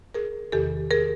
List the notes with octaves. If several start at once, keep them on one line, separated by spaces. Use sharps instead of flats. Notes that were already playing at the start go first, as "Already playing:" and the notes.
G#4 A#4
E2 C3 D#3 G4 A4
G#4 A#4